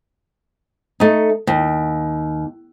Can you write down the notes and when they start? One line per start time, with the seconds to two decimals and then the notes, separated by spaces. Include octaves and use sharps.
1.00 A3 D#4
1.47 D#2